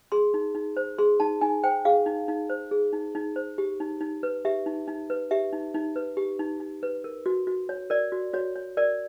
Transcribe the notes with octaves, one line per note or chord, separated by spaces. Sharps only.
G#4 C6
D#4
D#4
C5
G#4 C6
D#4 A5
D#4 G#5
C5 G5
G#4 F5
D#4
D#4
C5
G#4
D#4
D#4
C5
G4
D#4
D#4
B4
G4 E5
D#4
D#4
B4
G4 E5
D#4
D#4
B4
G4
D#4
D#4
B4
A#4
F#4
F#4
C#5
A#4 D5
F#4
F#4 C#5
C#5
A#4 D5